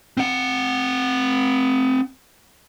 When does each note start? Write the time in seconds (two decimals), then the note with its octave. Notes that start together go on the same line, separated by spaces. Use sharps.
0.17 C4 F#5